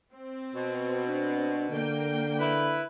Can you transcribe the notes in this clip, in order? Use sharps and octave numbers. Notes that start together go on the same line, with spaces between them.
C4
B2
D4
D3 A#3 G5
E4 B4